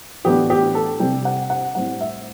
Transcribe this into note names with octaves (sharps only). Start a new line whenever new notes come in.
A2 E3 B3 D4 G4
G4
A4
C3 G3 C4 G5
F#5
F#5
A2 G3 C4 F#5
E5